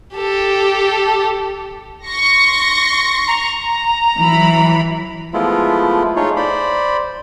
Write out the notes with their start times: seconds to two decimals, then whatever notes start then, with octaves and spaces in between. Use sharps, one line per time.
0.15 G4 A4
2.07 C6 C#6 A#6
3.28 A#5
4.19 E3 F#3 B5
5.34 F3 G#3 A3 B3 E4 F4
6.16 A3 D#4 F4 G#4 C#5
6.36 C5 D5 B5